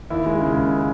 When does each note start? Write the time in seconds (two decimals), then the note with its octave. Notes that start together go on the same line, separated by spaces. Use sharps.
0.10 D#2 E4
0.26 G#3
0.41 C#3
0.56 D#2